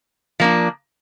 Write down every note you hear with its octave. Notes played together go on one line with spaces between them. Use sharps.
F3 A#3 D4